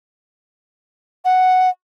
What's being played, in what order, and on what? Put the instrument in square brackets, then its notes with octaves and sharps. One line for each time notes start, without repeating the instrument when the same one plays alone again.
[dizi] F#5